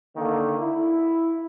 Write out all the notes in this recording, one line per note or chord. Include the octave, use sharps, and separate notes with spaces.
D3 D#3 A#3
E4